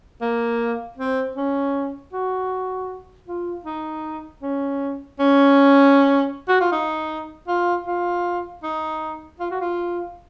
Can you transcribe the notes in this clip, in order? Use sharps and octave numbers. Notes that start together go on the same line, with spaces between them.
A#3
C4
C#4
F#4
F4
D#4
C#4
C#4
F#4
F4
D#4
F4
F4
D#4
F4
F#4
F4